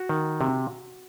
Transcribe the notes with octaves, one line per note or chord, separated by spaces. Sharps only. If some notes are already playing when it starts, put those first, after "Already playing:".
Already playing: F#4
D#3
C3